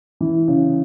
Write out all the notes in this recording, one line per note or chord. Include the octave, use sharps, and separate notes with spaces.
E3
C#3